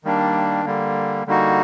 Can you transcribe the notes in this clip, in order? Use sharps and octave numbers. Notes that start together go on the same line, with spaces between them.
D#3 G3 A#3 D4
D3 G3 A#3
D3 G3 A#3 D#4 F#4